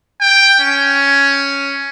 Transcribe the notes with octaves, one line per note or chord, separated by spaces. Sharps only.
G5
C#4